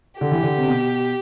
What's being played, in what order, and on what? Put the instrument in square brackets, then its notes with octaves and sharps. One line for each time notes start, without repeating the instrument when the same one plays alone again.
[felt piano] D3 [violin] G4
[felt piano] E3
D3
C3
B2